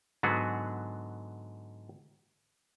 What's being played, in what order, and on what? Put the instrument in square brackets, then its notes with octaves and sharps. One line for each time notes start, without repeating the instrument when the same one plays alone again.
[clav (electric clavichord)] G#2 D3 F#3 B3 F#4 G#4